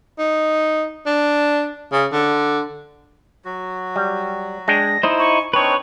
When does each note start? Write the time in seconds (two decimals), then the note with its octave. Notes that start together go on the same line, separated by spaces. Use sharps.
0.19 D#4
1.06 D4
1.93 C#3
2.12 D3
3.45 F#3 F#4
3.96 G3
4.68 G#3 D4 G5 A#6
5.03 D#4 E4 C5 D#5
5.19 G#5 C#6
5.53 C4 D4 D#4 B4 C#5 C#6